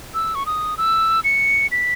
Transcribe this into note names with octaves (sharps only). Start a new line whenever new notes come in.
E6
C#6
D#6
E6
C#7
B6